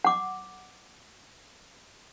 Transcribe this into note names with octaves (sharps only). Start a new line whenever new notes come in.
F#5 D6